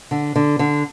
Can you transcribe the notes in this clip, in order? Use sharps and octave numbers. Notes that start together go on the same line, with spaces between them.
D3
D3
D3